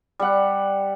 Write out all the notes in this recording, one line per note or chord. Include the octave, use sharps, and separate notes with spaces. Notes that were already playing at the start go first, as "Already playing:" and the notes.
G3 F#5